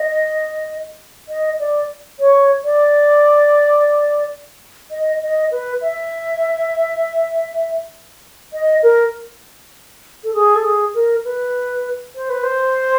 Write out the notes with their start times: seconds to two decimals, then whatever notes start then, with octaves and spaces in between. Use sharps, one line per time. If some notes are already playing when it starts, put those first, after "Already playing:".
Already playing: D#5
1.29 D#5
1.60 D5
2.19 C#5
2.64 D5
4.91 D#5
5.22 D#5
5.51 B4
5.82 E5
8.53 D#5
8.83 A#4
10.24 A4
10.34 G#4
10.55 A4
10.64 G#4
10.94 A#4
11.25 B4
12.16 C5
12.30 B4
12.43 C5